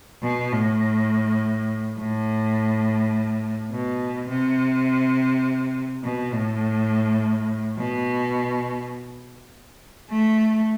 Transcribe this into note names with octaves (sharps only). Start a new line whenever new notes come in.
B2
A2
A2
B2
C3
B2
A2
B2
A3